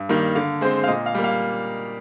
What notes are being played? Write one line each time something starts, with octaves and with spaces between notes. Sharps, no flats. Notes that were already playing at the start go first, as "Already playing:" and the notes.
Already playing: G2
D#3 G3 A#3
D3 F5
G#3 C4 C5
F5
A#2 D#5
F5
G3 A#3
F5